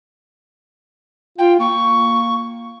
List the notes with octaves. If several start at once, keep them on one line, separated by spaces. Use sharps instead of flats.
F4 G5
A#3 C#6